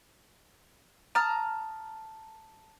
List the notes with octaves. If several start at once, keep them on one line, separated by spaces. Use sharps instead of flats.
A5 A#5 D#6 F6